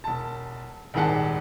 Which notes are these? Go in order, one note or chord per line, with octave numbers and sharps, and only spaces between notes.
E1 A5
D#1 G#1 D#3 G#4 F#5 A5